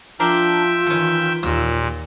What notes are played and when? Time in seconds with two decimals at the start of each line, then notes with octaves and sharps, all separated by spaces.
0.20 F3 D4 F4 A#4 E5 G5
0.87 D#3 E3 A3 C#4
1.43 D#2 A#2 E6